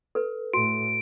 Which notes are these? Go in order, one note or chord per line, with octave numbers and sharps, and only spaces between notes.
A4 B4
A2 F#4 D7